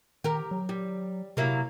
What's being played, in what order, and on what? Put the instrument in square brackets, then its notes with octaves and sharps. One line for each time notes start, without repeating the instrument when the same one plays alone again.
[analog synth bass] D#3 [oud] G4 A#4
[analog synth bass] F#3
[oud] G3
[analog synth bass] C3 [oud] F#3 A#3 E4